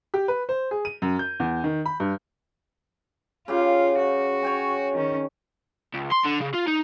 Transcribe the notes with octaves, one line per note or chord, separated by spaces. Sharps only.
G4
B4
C5
G#4
D#7
F#2
G6
E2
D#3
B5
G2
C#3 F4 G4 F5
F#4
C#5 G5 G#5
D#3 C#4
C#2
C6
D3
C#3
F4
D#4